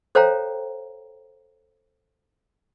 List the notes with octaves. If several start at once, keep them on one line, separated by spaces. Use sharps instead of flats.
A4 C5 C#5 F5 G5 A#5